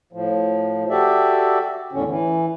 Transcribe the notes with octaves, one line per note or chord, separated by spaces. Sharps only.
A2 F3
F#4 G4 A4 D5 E5
E2 A2 D3 C#4
E3